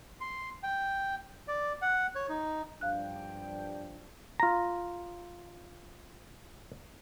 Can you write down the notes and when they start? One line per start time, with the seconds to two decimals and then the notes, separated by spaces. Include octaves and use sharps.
0.20 C6
0.63 G5
1.48 D5
1.82 F#5
2.15 C#5
2.29 D#4
2.81 G2 F3 D4 F5 G5 F#6
4.40 F4 A#5